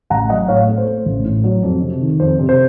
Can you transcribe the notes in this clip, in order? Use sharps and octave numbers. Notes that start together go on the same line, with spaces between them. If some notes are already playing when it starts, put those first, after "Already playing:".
A1 F#5 A#5
F#3 D#5 F#5
A2 C#5 F5
A3
C5
A3
A1
A2
F#3
F2
C3
D#3
F2 C5
C3
C5